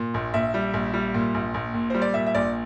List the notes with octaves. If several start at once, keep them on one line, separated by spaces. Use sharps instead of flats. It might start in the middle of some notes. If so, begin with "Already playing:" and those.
Already playing: A#2
A#1
A#1 E5
G3
A#1
G3
A#2
A#1
A#1
A#2
G3 C5
D5
A#2 E5
E5
A#1 D5